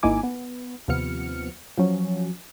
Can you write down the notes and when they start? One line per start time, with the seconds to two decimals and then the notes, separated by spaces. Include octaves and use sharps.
0.03 G#1 A#3 D#4 E4 G#5 D6
0.23 B3
0.88 D#2 C3 F3 B3 F6 C#7
1.78 F3 F#3 C#4